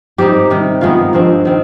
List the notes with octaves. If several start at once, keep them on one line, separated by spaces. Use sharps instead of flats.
G#2 G3 C4 D#4 G4
C3 D#3 G3
G#2 D#3 G#3 B3 F4
G2 F3 G#3 C4
D#3 G#3 C4